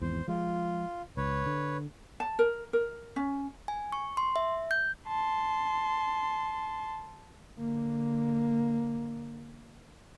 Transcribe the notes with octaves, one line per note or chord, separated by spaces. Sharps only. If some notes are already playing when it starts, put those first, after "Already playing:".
G#1 E2 C5
F3 G#3 F4
C#2 B4 C#5
D3
A5
A#4
A#4
C#4
G#5
C#6
C6
E5
G6
A5 C6
D3 A#3